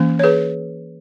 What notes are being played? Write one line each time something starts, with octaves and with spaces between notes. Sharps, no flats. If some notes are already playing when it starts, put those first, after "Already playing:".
Already playing: E3 A#3 C#4
C#5
G#4 B4